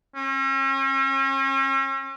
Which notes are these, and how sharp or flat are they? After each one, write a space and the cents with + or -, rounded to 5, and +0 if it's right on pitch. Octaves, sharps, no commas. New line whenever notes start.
C#4 -40